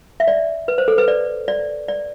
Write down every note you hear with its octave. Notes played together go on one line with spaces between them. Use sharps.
E5
D5
B4
C5
A4
B4
D5
D5
D5